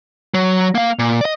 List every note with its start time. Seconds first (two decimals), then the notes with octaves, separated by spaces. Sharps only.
0.34 F#3
0.75 A#3 F5
0.99 A#2
1.21 D5 D#5